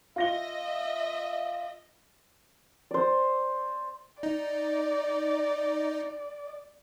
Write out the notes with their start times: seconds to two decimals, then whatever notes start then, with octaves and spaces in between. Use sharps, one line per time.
0.16 F4 D#5 E5 A#6 G7
2.91 C5 D5
4.23 D#4 D5